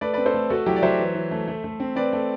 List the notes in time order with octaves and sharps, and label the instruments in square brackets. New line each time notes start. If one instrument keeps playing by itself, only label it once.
[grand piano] A3 B4 D5
C4 B4 D5
A4 C5
A3
A3 F#4 A4
F#3 E4 G4
D5
F#3 C5 E5
E3
E3
A3
A3
A3
C4
C4 B4 D5
A3